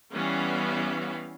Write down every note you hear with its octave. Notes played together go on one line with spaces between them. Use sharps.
E3 G3 B3 C#4 F5